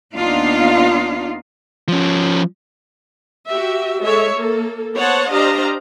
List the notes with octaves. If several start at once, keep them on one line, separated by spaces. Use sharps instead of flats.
D#2 B3 D4 D#4 F4 F5
F3 C#4
F#4 G4 E5
G#3 A4 C#5 E5
A#3 A4
B3 C5 C#5 F#5 A5
D4 G4 C5 D#5 F5 A#5